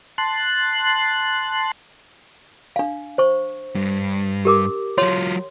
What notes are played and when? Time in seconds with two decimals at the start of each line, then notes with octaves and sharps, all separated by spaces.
0.18 A5 C6 F#6
2.76 D4 F5
3.18 C5 C#6
3.75 G2
4.45 G4 A#4 D6
4.98 F#3 F4 C#5 C6